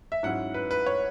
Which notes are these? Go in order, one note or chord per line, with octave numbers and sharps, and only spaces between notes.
E5
G#2 F#3 C#4 E4 F#5
B4
B4
C#5